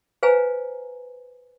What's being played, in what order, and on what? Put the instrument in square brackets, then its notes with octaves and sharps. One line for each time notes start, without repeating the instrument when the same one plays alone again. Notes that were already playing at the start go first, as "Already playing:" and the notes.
[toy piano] B4 C5 F5 G#5 A#5